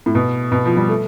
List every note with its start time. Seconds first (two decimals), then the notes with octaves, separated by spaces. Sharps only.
0.06 A2
0.15 B2
0.52 B2
0.65 F3
0.77 G3
0.89 A3